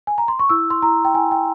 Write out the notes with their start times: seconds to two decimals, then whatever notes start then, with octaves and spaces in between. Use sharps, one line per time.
0.07 G#5
0.18 A#5
0.28 C6
0.39 C#6
0.49 E4 E6
0.70 C6
0.82 E4 A#5
1.05 G5
1.14 E4 G#5
1.31 G5